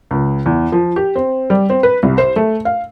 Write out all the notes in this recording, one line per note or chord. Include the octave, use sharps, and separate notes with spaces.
C#2
E2
F3
G4
C4
G3
C4
B4
C2
C5
A3
F5